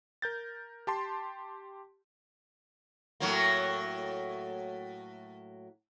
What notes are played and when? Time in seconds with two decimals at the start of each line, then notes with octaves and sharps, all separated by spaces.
0.22 A#4 G6 A6
0.87 G4 A5 C6
3.20 A2 F#3 A#3